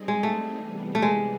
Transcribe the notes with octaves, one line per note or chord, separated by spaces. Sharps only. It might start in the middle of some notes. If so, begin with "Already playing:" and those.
Already playing: G3 C4 D#4 G#4
G#3
A3
C3 E3 G3 B3
A3
G#3